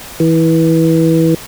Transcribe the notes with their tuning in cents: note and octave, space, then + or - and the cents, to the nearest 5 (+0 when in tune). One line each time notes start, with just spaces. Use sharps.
E3 -20